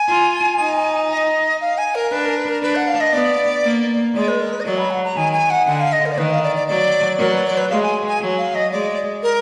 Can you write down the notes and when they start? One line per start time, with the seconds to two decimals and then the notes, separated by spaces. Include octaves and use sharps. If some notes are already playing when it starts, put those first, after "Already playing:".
Already playing: G#5
0.09 F4
0.59 D#4
1.11 D#5
1.61 F5
1.78 G#5
1.95 A#4
2.12 D4 B4
2.25 A#4
2.37 B4
2.49 A#4
2.63 D4 B4
2.76 F#5
2.88 F5
3.00 D#5
3.13 B3 D5
3.64 A#3
4.15 G#3 D5
4.28 B4
4.40 A#4
4.53 B4
4.60 D#5
4.65 F#3 D5
4.78 B5
4.90 F#5
5.04 A#5
5.16 D#3 G#5
5.33 G#5
5.50 F#5
5.67 D3 F#5
5.80 F5
5.93 D#5
6.06 A#4
6.12 D5
6.18 D#3 B4
6.30 F5
6.43 D5
6.56 D5
6.68 F#3 D5
7.19 F#3 A#4
7.32 B4
7.45 D5
7.57 B4
7.70 G#3 F5
7.83 G#5
8.08 G#5
8.21 F#3
8.38 F5
8.55 D#5
8.72 G#3 D5
9.23 A#4